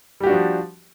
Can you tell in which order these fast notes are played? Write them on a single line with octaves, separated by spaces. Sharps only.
G3 G4 F#4 D4 F3